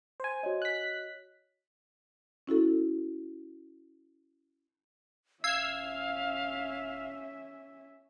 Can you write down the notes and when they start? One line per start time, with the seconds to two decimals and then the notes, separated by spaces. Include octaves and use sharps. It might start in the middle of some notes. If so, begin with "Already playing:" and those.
0.20 C5 G#5
0.43 F#4 C#5 D#5
0.62 F#6 B6
2.47 C#4 E4 F#4 A4
5.44 D1 C#4 E5 F5 E6 G#6 C7